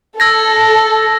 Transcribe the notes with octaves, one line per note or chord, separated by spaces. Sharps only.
A4 E6 G#6 A#6